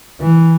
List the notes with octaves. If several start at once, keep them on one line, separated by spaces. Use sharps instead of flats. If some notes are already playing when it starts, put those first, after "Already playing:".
E3